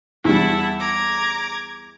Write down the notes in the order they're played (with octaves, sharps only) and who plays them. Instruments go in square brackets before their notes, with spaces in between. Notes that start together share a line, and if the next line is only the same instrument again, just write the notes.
[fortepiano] E2 G3 [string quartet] E4 F#5 A5
[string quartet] A#5 D6 G#6